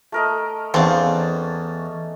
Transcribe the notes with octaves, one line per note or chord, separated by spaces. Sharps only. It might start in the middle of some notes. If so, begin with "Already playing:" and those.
A3 A#4 D#5
E2 C4 C#4 D#4 F5 A5